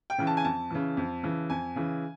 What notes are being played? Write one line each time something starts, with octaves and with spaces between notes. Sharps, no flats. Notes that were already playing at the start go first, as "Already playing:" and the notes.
G5
C#3 E3
A5
G#5
F2 A5
C#3 E3
F2
C#3 E3
F2 G#5
C#3 E3